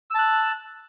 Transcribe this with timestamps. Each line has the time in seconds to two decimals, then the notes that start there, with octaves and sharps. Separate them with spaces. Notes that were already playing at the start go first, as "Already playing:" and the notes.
0.11 E6
0.15 A5
0.19 F#6